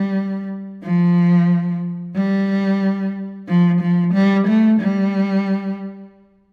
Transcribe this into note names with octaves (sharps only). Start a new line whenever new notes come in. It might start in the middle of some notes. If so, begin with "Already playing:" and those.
Already playing: G3
F3
G3
F3
F3
G3
A3
G3